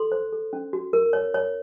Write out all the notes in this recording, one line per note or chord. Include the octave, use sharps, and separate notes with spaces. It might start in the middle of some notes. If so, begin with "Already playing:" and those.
Already playing: A4 C6
C5
A4
C#4
F#4
A#4
C#5
C#5